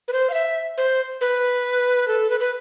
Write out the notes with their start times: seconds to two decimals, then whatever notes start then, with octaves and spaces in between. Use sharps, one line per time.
0.08 B4
0.13 C5
0.30 F5
0.34 E5
0.78 C5
1.21 B4
2.08 A4
2.30 B4
2.40 B4